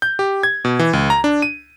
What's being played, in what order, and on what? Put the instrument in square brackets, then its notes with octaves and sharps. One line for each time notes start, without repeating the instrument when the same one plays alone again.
[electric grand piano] G6
G4
G#6
B2
E3
C#2
A#5
D4
D#7